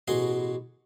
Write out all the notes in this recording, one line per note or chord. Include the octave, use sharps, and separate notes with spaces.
A1 B2 F#4 G#4 C6